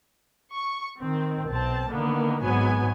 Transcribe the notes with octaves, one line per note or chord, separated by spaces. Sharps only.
C#6
D#3 C4
B1 C4 A5
D3 D#3 A#3 B3
G#1 G#2 F#3 B3 G#5